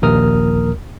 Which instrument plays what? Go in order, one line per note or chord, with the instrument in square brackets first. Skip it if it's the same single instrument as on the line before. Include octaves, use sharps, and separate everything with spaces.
[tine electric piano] A#1 D#2 A#4 D#6 F6